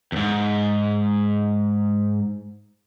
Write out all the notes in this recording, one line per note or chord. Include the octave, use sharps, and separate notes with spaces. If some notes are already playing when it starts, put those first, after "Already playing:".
E2 G#2